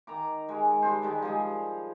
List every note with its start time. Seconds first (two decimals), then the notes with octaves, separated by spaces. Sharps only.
0.07 D#3 A#5 D6
0.49 G#3 G#5
0.82 G3 D4 C5
1.02 D#3 G3 G#3
1.22 F3 G3 G#4